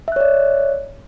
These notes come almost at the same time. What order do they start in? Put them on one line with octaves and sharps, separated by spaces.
E5 F#6 C#5 D5